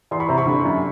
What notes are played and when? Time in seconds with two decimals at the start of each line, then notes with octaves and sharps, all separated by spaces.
0.11 E2 C6
0.20 B5 C#6
0.29 C3 A#5 C6
0.38 B5 C#6
0.47 D3
0.65 F#2